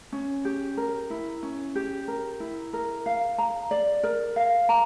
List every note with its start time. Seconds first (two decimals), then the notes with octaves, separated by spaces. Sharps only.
0.12 C#4
0.45 G4
0.77 A#4
1.10 E4
1.43 C#4
1.75 G4
2.08 A#4
2.40 E4
2.73 A#4
3.06 F5
3.38 A#5
3.71 D5
4.03 A#4
4.36 F5
4.69 A#5